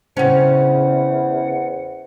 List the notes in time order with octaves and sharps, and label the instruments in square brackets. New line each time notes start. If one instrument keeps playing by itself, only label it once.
[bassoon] E2 [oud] C#3 C#4 [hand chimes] C5 G5 [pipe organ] F#5